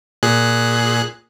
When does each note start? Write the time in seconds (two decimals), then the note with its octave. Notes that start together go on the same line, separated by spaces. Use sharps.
0.23 A#2 G#4 F#6